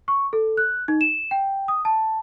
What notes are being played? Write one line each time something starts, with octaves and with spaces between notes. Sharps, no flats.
C#6
A4
F#6
D#4
E7
G5
D#6
A5